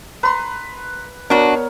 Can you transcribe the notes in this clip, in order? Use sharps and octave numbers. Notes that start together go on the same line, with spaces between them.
B4 A#5 C6
B3 D4 F#4 A#4 C#5 D5